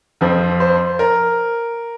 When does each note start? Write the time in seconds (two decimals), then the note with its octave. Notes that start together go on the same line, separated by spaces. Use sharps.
0.21 F2 F3 C4
0.60 C5
0.99 A#4